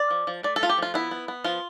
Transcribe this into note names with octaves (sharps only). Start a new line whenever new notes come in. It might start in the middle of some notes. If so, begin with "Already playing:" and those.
Already playing: D5
F3
F3
A3 D5
A4
A3 F4
G4
F3 F4
B3 E4
B3
B3
F3 F4